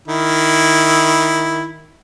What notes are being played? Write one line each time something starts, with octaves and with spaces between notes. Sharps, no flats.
D#3 E4